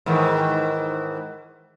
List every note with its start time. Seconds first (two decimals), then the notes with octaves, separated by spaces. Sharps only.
0.06 G#2 D#3 E3